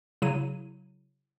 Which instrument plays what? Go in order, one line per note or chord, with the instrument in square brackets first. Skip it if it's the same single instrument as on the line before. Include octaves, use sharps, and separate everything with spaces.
[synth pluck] C#3 F#3 E4 D#7